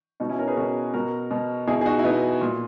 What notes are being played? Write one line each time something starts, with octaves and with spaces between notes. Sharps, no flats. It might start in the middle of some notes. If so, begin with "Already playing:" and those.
B2 D#4 F#4
C#4 E4
A#4 C#5
G#4 B4
B2 F#4 A#4
B2 F#4 A#4
B2
B2 E4 G#4
G#4
D#4 F#4
E4
B2 B3 D#4
A#2